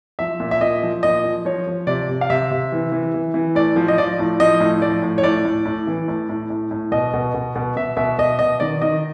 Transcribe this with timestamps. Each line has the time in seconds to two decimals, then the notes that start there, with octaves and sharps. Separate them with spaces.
0.19 F3 E5
0.40 A#2
0.51 E5
0.61 A#2 D#5
0.83 F3
1.03 A#2 D#5
1.24 F3
1.45 F3 C#5
1.67 F3
1.87 C3 D5
2.09 C3
2.21 F5
2.30 C3 E5
2.51 C3
2.72 E3
2.92 E3
3.14 E3
3.34 E3
3.55 A2 D5
3.76 F3
3.88 D#5
3.98 F3 D5
4.19 A2
4.40 F3 D#5
4.60 A2
4.82 F3 D5
5.03 A2
5.18 C#5
5.23 A2 D5
5.45 A2
5.65 A2
5.87 E3
6.08 A2
6.29 A2
6.50 A2
6.71 A2
6.92 B2 D#5
7.14 B2
7.34 B2
7.56 B2
7.76 B2 E5
7.97 B2 E5
8.19 B2 D#5
8.39 B2 D#5
8.60 D#3 D5
8.82 D#3 D#5